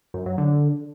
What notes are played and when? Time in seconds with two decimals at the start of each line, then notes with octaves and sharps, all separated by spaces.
0.14 F#2
0.26 F#3
0.38 D3